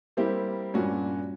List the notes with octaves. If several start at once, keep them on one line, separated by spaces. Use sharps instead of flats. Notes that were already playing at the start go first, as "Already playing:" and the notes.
G3 A#3 C4 E4 G4
G2 A#2 C#4 F#4